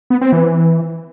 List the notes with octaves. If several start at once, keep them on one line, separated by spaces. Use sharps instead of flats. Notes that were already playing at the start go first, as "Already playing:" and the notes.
B3
C4
E3